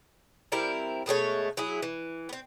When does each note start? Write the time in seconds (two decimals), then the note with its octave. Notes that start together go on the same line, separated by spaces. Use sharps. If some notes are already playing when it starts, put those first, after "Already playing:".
0.52 G3 C4 E4 A#4
1.06 B2 G#3 A3 C#5
1.57 F#3 E4 G#4
1.82 E3
2.29 B3 C4